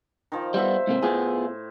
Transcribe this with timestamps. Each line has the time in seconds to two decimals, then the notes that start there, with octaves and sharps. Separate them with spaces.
0.32 D#3 F3
0.54 G3 B3 C5 E5
0.87 G#2 C3 A#3
1.03 A2 B3 F4 G#4